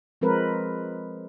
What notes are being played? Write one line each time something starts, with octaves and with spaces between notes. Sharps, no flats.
F3 G#3 C4 A#4 B4